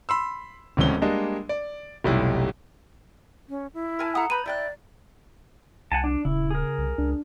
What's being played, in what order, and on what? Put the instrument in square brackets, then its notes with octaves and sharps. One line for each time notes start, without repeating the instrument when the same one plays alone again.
[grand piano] B5 C6 E6
D1 C#2 E3 C4 C#4 G7
G3 G#3 A#3 D4 D#5
D5
F1 B1 G3 E4
[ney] C#4
E4
[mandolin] A#4 G#5 A5
[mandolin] A4 F#5 [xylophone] A#5 D#6
[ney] B4 [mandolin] A#5 B5 G6 [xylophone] D#7
[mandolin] E4 G5 F#6 [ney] D5
[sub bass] C2 [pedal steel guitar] F#5 G#5 A5
[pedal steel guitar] D4
[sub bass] D#1 [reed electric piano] C#3 [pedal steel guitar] E4
[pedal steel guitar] G#4 A#4
[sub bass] C2
[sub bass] C#2 [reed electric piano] D4